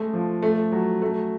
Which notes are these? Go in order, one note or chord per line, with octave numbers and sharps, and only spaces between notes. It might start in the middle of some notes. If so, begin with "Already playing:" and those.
Already playing: G#3 A3
F3
A3
F#3
A3